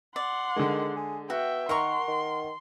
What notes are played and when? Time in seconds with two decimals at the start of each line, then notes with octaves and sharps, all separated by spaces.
0.16 D5 F#5 C6
0.56 D3 D#3 G#3
0.96 G#4
1.30 B3 F#4 E5 G5
1.69 D#3 A#4 F#5 A#5 C6 C#6
2.08 D#3